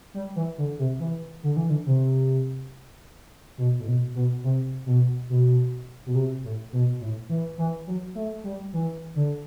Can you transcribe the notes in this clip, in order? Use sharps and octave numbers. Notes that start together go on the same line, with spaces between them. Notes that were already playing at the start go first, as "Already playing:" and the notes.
G3
E3
D3
C3
E3
D3
E3
D3
C3
B2
A2
B2
B2
C3
B2
B2
B2
C3
A2
B2
A2
E3
E3
F#3
A3
G3
E3
D3